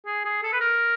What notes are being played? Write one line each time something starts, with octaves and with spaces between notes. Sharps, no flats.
G#4
G#4
A4
B4
A#4